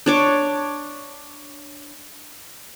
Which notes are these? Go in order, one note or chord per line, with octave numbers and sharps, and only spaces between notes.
D4 C#5 D6